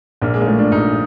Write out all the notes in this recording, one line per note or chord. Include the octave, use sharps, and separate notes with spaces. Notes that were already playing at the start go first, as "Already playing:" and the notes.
A#1 A#3
G#3
A#3
A2 F3 A3
D4
A#1 D#4